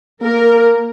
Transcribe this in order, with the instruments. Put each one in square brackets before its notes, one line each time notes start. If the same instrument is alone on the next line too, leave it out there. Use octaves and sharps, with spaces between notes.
[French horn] A#3 [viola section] A#4